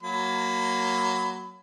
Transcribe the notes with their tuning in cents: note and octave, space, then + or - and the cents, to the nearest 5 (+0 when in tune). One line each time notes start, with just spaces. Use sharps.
F#3 +5 A#3 +0 B5 +20